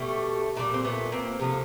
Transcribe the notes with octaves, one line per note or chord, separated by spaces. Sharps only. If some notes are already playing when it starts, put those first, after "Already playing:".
Already playing: B2 G3 A3
A#2 G3 A#3
C4
A3 B3
A#3 C4
C3 F3 A3 A#3